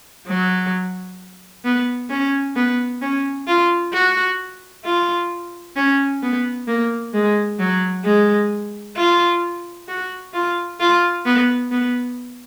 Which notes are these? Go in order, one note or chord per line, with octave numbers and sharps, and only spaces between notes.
F#3
B3
C#4
B3
C#4
F4
F#4
F4
C#4
B3
A#3
G#3
F#3
G#3
F4
F#4
F4
F4
B3
B3